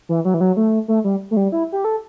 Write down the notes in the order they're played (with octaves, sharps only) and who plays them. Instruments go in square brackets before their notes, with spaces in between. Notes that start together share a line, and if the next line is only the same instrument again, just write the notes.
[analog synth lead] E3
F#3
E3
F#3
A3
A3
G3
A3
G3
E4
G4
A4